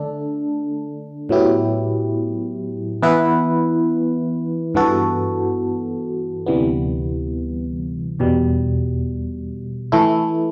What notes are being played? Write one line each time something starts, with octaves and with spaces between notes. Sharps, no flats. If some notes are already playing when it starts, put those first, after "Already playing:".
Already playing: D3 A3 D4 A4
A2 F#3 B3 E4 G4
E3 B3 E4 B4
G2 E3 B3 F#4 A4
D2 C3 E3 G3 B3
E2 B2 G3
E3 A3 E4